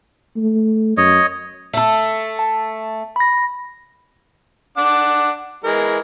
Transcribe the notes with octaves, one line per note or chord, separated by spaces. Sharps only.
A3
F#2 C#5 D#5
A3 A4
A5
B5 A#6
D4 F#5 D6
E3 G#3 A#4